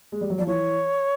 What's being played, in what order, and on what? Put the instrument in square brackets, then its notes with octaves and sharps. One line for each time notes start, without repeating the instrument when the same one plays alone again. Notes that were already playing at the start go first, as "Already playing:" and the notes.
[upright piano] G#3
G3
F#3
[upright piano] F3 [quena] D5
[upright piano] E3 [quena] C#5